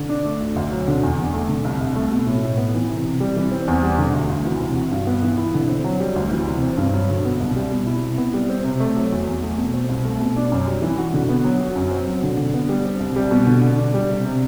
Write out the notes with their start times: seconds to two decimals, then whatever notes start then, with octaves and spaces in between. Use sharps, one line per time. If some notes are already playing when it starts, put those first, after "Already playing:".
Already playing: D3
0.09 D4
0.25 A3
0.40 D2
0.56 D2
0.72 F#3
0.88 D3
1.03 E2
1.18 E2
1.33 A3
1.49 D3
1.65 C2
1.81 C2
1.96 A3
2.11 B2
2.27 A2
2.43 A2
2.58 B3
2.74 E3
2.90 C3
3.05 C3
3.20 G3
3.36 E3
3.52 C4
3.68 E2
3.82 G3
3.98 D3
4.14 D2
4.30 D2
4.44 E3
4.60 C3
4.76 F#4
4.91 G2
5.07 B3
5.22 E3
5.38 E4
5.54 D3
5.69 C4
5.84 F#3
6.00 G3
6.16 D2
6.31 E3
6.48 C3
6.63 C4
6.77 G2
6.93 F#3
7.09 D3
7.25 B3
7.40 C2
7.56 G3
7.71 B2
7.86 E4
8.03 C3
8.18 B3
8.34 G3
8.50 C4
8.64 C3
8.80 A3
8.96 F#3
9.12 E2
9.27 E2
9.42 A3
9.58 B2
9.74 C4
9.89 C2
10.05 A3
10.20 B2
10.36 D4
10.52 F#2
10.67 G3
10.82 E3
10.98 F#4
11.14 D3
11.29 B3
11.44 F#3
11.61 F#4
11.76 F#2
11.91 C4
12.06 F#3
12.23 D3
12.37 D3
12.54 B3
12.69 G3
12.85 C4
13.00 C2
13.16 G3
13.31 B2
13.47 D3
13.62 D3
13.78 D4
13.94 G3
14.09 C3
14.25 C3